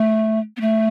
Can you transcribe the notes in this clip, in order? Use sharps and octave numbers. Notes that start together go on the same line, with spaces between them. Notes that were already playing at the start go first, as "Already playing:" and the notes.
Already playing: A3
B3
A3